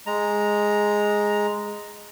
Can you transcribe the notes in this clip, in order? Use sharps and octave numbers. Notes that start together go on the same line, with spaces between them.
G#3 A#5